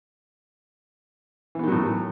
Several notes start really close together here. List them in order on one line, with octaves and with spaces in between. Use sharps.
E3 B3 D#3 F#3 A2